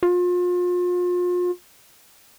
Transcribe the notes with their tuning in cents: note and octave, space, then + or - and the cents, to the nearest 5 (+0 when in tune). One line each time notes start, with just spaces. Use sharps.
F4 +35